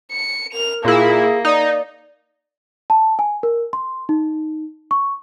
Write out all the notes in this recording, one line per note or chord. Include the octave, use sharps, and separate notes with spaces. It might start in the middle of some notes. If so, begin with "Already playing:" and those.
C#7
A#4 F7
A#2 A#3 E4 G#4
D#4 D5
A5
G#5
A#4
C6
D#4
C#6